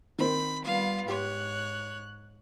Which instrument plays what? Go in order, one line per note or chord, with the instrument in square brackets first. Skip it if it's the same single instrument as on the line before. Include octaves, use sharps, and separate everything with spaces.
[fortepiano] D#3 C4 [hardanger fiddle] B5
[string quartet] G3 B3 F4 [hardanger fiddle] F5
[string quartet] G#2 F#6 [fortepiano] G4 [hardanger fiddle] C#5